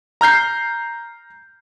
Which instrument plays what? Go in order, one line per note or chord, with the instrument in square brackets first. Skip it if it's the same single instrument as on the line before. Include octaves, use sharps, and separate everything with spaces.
[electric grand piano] A#5 F6 G6 C7